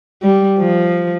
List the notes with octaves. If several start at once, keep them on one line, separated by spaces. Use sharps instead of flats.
G3
F3